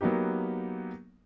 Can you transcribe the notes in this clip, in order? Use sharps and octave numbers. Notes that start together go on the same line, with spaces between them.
F#3 A#3 B3 D#4 G4